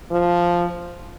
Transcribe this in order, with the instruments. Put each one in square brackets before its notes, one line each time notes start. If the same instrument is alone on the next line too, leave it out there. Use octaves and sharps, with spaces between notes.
[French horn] F3